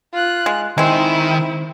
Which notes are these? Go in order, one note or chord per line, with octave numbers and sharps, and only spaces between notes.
F4 F#6
G#3
D#3 G#3 C4 E4